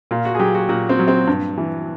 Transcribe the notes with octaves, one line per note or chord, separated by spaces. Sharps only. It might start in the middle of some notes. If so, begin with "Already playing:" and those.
A#2 F4
F#4
G#4
F#3 G4
F#4
A#2 F#4
C4
F#3
C4
G2
E3